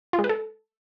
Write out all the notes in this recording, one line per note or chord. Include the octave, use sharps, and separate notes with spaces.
F4
G#3
B4
A4